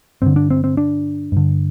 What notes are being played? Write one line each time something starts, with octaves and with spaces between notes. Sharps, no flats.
G2 D3 C4
D4
C4
C4
D4
G2 D3